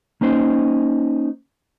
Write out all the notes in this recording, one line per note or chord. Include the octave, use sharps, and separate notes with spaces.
A#3 C#4 D#4 C5